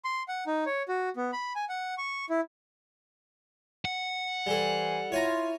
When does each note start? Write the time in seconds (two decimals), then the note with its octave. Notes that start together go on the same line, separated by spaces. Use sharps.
0.05 C6
0.28 F#5
0.47 D#4
0.66 C#5
0.88 F#4
1.16 B3
1.33 B5
1.55 G#5
1.69 F#5
1.98 C#6
2.29 E4
3.85 F#5
4.46 E3 G3 A4 C5 G#5
5.12 E4 F4 C#5 G#5 A#5